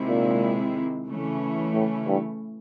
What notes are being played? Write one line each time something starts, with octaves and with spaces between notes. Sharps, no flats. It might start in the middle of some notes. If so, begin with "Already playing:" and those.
Already playing: C3 D#3 G#3 C4 E4
A#2
C#3 E3 A3 C#4 E4
A2
G2